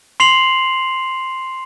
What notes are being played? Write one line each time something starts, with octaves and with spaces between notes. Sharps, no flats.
C6 C7 F7 F#7